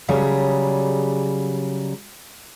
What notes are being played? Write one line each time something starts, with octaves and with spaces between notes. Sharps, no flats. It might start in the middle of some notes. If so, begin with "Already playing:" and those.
C#3 F#3 G3 G#4